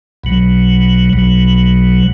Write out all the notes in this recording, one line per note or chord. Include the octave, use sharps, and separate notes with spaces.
B1 B2 F#3
B1 B2 F#3